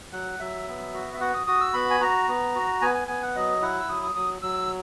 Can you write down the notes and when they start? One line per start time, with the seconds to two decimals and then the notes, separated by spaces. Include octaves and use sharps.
0.12 F#3 F#5
0.40 F#3 E5
0.67 B3
0.94 F#4
1.14 E5
1.20 F#4 F#5
1.34 D#6
1.47 F#4 D#6
1.61 E6
1.73 B3 B5
1.90 G#5
2.00 F#4 A#5
2.28 B3
2.55 F#4
2.81 B3 G#5
2.94 G#5
3.08 B3 G#5
3.22 F#5
3.35 F#3 D#5
3.62 E4 F#5
3.79 E6
3.89 F#3 D#6
4.03 D#6
4.15 F#3 D#6
4.42 F#3 E6